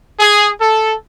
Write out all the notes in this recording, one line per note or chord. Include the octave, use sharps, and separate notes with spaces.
G#4
A4